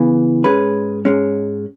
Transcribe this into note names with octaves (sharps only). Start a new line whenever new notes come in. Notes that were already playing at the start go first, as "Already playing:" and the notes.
Already playing: C#3 E3 B3
G#2 G#3 C#4 G#4 B4
G#2 G#3 C#4